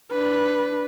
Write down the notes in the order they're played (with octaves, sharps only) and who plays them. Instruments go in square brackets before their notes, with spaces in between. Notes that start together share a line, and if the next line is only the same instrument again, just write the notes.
[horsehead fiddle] D4 B4